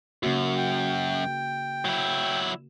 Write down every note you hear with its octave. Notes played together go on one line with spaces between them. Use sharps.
F#2 C#3 A#3 F#4
G5
F#3 E4